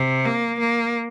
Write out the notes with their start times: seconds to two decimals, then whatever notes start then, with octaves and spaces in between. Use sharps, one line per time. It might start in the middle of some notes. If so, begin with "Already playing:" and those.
Already playing: C3
0.25 A#3
0.59 A#3